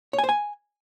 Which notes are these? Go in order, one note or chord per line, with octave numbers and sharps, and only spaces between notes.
C#5
G#5
C5
G#5